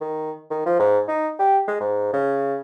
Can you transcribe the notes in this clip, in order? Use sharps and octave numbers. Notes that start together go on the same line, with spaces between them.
D#3
D#3
F3
G#2
D#4
G4
G#3
G#2
C#3